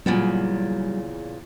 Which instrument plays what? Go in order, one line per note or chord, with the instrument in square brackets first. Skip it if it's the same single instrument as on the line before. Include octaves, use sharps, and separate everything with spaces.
[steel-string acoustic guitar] E2 A#2 C#3 [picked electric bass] F#3 G3